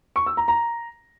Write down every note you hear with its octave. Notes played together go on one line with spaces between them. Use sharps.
C#6
E6
A#5
A#5